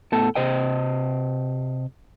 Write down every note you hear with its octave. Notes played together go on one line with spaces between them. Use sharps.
A2 B3 A4 A5
C3 C5 D#5 G5